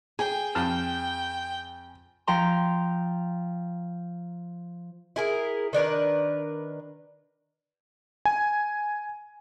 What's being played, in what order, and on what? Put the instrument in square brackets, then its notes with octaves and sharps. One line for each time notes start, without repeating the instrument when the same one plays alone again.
[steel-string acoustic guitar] G#4 [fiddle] G5 [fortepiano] G#5
[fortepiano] F2 A5 F6 [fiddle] G5
[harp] F3 G5 A#5 C6
[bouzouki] E4 G#4 A#4
D#3 D4 A#4 B4
[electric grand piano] G#5